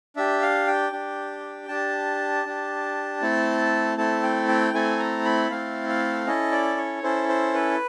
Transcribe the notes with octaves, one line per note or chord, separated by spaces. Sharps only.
D4 G4 E5
F5
G5
D4 G4
D4 G4 A5
D4 G4
A3 C4 E4 A4
A3 C4 E4 A4 A5
G5
G5
A3 C4 E4 A4 G#5
A#5
B5
A3 C4 E4 A4 F5
F5
C#4 E4 A4 D#5
D5
C#5
C#4 E4 A4 C5
C5
B4